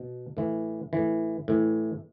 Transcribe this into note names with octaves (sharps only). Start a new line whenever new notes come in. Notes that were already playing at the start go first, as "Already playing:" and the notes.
Already playing: B2
A2 E3
A2 E3
A2 E3